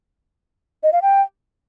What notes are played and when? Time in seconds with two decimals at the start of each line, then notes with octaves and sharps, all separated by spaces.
0.83 D#5
0.93 F5
1.02 G5